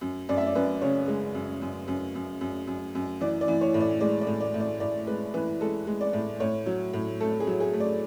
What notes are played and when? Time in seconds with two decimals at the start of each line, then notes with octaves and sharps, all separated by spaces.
0.01 F#2
0.29 F#2 D5
0.37 E5
0.47 D5
0.55 F#2 B4
0.82 C#3 C#5
1.08 G#3
1.35 F#2
1.62 F#2
1.88 F#2
2.15 F#2
2.41 F#2
2.67 F#2
2.95 F#2
3.21 E3 D5
3.41 D5
3.48 E3
3.61 C#5
3.74 A2
3.80 D5
4.00 G#3 D5
4.21 D5
4.27 A2
4.41 D5
4.54 A2
4.60 D5
4.80 A2 D5
5.07 G#3 B4
5.34 E3 B4
5.60 G#3 A4
5.87 G#3
6.01 D5
6.13 A2
6.40 A2 C#5
6.66 F#3
6.93 A2
7.21 A3 A4
7.40 G#4
7.47 F#3
7.60 G#4
7.73 A3
7.80 D5